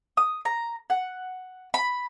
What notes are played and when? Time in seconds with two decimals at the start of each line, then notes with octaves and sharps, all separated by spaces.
0.17 D#6
0.45 A#5
0.90 F#5
1.74 B5